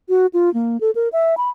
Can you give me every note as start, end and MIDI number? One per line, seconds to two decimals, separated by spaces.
0.09 0.27 66
0.34 0.52 65
0.54 0.80 58
0.81 0.91 69
0.95 1.08 70
1.13 1.35 76
1.37 1.49 83